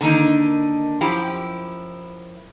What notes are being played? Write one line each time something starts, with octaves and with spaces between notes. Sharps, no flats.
D3 D#3 A#3 D4 D#4
F#2 F3 E4 G4